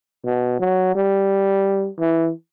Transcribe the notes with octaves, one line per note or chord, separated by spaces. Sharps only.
B2
F#3
G3
E3